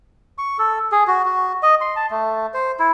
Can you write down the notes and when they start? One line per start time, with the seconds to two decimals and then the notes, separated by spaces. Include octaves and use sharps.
0.38 C#6
0.59 A4
0.92 G#4
1.07 F#4
1.25 F#4
1.63 D#5
1.81 C6
1.96 A5
2.11 A3
2.54 C5
2.79 E4